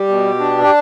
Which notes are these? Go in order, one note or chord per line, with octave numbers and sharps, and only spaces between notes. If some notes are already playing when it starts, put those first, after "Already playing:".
Already playing: G3 G4
B2
D4
G4